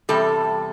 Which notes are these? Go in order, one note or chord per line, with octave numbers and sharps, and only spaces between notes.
E2 C3 G3 A4